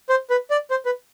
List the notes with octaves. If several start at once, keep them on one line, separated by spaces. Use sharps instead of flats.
C5
B4
D5
C5
B4